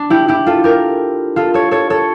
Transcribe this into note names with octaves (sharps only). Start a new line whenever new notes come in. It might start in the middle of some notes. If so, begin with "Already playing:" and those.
Already playing: D4
E4 G4
E4 G4
F4 A4
G4 A#4
F4 A4
A4 C#5
A4 C#5
A4 C#5